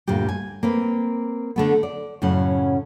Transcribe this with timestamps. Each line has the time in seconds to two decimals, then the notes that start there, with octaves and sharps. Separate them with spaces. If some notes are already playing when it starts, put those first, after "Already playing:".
0.08 D2 G2 A#2 G4
0.29 G#5
0.63 A#3 C4 B4
1.56 D3 A3 B3
1.83 D5
2.22 F#2 A2 C#3 C#4 F#5